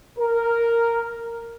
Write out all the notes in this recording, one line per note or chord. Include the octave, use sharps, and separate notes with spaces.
A#4